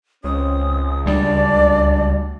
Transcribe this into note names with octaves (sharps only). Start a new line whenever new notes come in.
C#2 C4 C#4 D#6
D2 G3 D4 D5